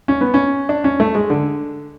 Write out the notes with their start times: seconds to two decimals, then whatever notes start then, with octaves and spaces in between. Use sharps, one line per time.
0.08 C#4
0.21 B3
0.34 C#4
0.69 D4
0.84 C#4
1.00 A3
1.15 G#3
1.30 D3